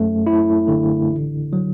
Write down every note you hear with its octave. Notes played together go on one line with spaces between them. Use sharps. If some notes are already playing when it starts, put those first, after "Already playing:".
Already playing: F#2 A3
E4
D3
A1
F#3